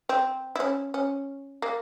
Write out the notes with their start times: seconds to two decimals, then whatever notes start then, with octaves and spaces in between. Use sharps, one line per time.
0.09 C4
0.55 E4
0.60 C#4
0.94 C#4
1.62 A#3